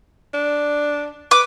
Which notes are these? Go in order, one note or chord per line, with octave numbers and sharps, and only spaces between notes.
D4
B4 D6